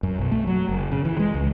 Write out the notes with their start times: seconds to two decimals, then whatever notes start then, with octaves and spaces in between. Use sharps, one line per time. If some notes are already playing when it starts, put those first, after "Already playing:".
0.03 F#2
0.19 B1
0.32 A3
0.47 F#3
0.69 F#1
0.92 C#3
1.05 E3
1.19 G#3
1.34 C#2